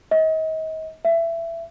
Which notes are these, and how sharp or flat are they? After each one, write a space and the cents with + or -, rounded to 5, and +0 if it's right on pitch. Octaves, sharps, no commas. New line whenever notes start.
D#5 +35
E5 +20